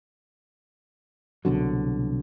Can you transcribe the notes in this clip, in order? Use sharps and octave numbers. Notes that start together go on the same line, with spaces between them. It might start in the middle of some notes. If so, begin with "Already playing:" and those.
C2 B2 D3 F#3